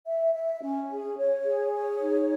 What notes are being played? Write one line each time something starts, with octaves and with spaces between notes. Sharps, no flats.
E5
E5
C#4
G#4
C#5
G#4
C#5
D#4